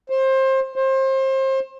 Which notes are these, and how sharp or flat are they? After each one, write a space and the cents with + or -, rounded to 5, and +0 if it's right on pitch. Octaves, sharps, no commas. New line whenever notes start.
C5 +25
C5 +30